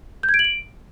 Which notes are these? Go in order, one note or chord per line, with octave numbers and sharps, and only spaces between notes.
G6
G#6
D7
F#7
D7